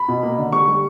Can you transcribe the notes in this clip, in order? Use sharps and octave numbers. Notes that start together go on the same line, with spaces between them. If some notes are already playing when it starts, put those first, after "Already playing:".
Already playing: B5
B2
A#3
D3
G3 C#6
G3